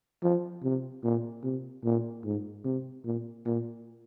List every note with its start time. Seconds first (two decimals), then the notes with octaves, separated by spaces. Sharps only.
0.23 F3
0.63 C3
1.03 A#2
1.43 C3
1.84 A#2
2.25 G#2
2.65 C3
3.05 A#2
3.46 A#2